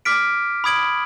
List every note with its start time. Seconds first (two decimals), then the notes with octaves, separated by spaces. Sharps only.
0.05 D6 F6 B6 D7
0.64 B5 D#6 G#6 D7 F#7